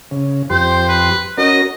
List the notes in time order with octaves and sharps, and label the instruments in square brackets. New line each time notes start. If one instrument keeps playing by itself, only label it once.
[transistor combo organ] C#3
[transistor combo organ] F2 G4 C6 [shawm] C5
[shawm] B4
[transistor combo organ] C#4 F#4 A#4 [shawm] D#5